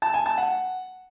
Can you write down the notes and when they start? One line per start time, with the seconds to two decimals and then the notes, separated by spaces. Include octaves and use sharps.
0.02 A5
0.14 G#5
0.26 A5
0.38 F#5